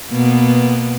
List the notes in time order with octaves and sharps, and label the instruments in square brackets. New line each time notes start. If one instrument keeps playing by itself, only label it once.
[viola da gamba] B2 A#3 B3